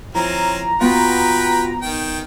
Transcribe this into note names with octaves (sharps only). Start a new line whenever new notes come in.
F3 C4 C#4 E4 A#5
B3 F4 F#4 B4 G5
D#3 G5